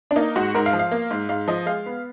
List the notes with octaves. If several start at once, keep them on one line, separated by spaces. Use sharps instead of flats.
D4
A#3 D#4
G#2 F#4
G#2 A#4
F5
F3
F5
A#3
G#2
G#2 F5
F3 D#5
G#3 F5
B3